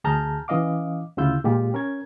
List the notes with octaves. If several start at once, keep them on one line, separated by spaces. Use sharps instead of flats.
D2 G#4 A5 A#5 F6 G6
E3 C#4 D#5 F5 D6
D2 C#3 E4 F4 E6 G6
A#2 G#3 F4 G4
C#4 A#4 C#5 G#6